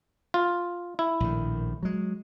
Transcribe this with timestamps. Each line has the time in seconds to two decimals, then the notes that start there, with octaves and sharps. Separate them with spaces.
0.34 F4
0.99 E4
1.20 A#1 A2 D#3
1.83 F#3 G#3